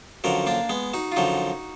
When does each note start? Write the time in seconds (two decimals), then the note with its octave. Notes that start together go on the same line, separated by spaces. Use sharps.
0.24 F#2 D3 F3 F#4 A#4
0.47 A#3 D4
0.70 G#3 B3
0.94 D#4 F#4
1.12 F4
1.16 F#2 D3 F3 D#4 F#4